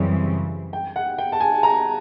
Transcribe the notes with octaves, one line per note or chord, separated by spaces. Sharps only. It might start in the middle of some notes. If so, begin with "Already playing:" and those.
Already playing: F#2 C#3 E3 G3 C4
G5
F#5
G5
A5
G#5
A#5